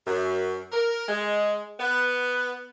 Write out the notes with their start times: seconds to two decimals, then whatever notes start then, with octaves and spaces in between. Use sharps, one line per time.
0.05 F#2
0.72 A#4
1.07 G#3
1.78 B3